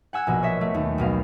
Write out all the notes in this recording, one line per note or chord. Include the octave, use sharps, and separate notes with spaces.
F#5 G#5 E6 F#6 G#6
A#1 B2 A#3
C#5 D#5 E5
A3
D#2
B1 B2 F5